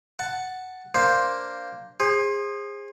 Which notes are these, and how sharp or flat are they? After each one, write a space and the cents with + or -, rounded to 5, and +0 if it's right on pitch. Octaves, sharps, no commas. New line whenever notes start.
F#5 +5 A5 +0
A#3 +0 D4 +0 C5 +0
G#4 -25 C5 +20